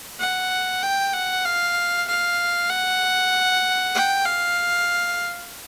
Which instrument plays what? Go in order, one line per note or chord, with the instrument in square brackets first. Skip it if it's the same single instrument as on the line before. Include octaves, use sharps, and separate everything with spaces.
[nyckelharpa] F#5
G5
F#5
F5
F5
F#5
G5
F5